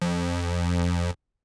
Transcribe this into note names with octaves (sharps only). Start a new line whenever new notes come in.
F2